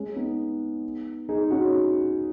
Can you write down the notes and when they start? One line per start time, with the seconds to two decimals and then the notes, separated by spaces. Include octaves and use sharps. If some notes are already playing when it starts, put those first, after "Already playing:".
Already playing: G#3 C#4
0.16 B3 D#4
1.29 D#4 G#4
1.50 C#4 F#4